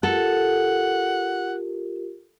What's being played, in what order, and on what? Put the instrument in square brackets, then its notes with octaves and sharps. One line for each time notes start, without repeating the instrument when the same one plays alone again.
[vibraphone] F4 G4 A#4 [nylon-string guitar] A4 [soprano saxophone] F#5